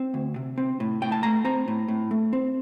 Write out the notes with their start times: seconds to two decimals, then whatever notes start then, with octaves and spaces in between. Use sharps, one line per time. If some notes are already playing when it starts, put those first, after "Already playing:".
Already playing: C4
0.14 D2
0.36 C3
0.58 C4
0.80 A2
1.02 A2 G5
1.12 A5
1.23 A3 A#5
1.45 C4 A#5
1.68 A2
1.88 A2
2.11 A3
2.33 C4